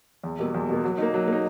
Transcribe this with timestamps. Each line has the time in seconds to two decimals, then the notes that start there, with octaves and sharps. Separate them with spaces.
0.24 E2
0.39 B2 G3 A#3
0.54 E2
0.69 B2 G3 A#3
0.84 F#3
0.98 A#3 D#4
1.14 F#3
1.28 A#3 D#4